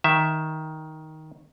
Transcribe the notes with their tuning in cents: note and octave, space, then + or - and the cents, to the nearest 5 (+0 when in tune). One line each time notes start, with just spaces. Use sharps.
D#3 +10 E5 +0